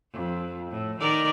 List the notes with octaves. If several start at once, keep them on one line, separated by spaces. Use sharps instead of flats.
F2
A2
D#3 A#4 D5